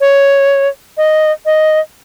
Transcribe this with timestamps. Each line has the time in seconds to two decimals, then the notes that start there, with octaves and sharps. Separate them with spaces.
0.01 C#5
0.97 D#5
1.46 D#5